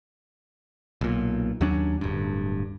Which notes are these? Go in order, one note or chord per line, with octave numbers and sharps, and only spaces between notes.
B1 A#2
D#2 F#3 C#4 D4
D1 G2